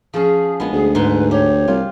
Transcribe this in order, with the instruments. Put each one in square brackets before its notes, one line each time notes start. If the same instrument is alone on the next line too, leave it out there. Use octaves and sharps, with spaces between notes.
[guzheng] F3 C#4 [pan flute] G#4
[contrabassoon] A#1 [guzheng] G#3 B3
[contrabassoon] D2 [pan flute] G#4
[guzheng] G#2 C6 [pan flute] B4
[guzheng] G4 [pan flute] C#5
[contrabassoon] C2 [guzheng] F4